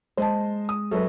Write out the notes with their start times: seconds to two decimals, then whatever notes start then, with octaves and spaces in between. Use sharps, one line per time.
0.17 G#3 C5 D#5 A5
0.69 D#6
0.91 F#2 A4 B4